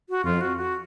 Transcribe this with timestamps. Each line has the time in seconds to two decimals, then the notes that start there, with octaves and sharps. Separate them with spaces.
0.10 F#4
0.25 F2 F4
0.41 F#4
0.57 F#4